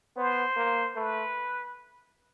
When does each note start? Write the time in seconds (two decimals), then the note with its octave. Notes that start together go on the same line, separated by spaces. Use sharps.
0.16 B3 C5
0.57 A#3
0.96 A3 B4